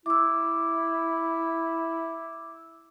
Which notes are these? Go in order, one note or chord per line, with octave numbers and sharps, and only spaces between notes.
E4 D6 E6